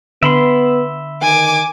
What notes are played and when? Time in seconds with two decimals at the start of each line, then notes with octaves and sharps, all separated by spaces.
0.23 D3 B3 E5 B5 C6
1.22 D#3 G#5 D6